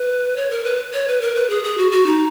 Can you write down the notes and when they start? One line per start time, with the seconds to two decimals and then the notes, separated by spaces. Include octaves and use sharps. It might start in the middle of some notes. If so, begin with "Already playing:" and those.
Already playing: B4
0.36 C#5
0.50 A#4
0.65 B4
0.93 C#5
1.08 B4
1.21 A#4
1.35 B4
1.50 G#4
1.64 G#4
1.78 F#4
1.92 F#4
2.06 D#4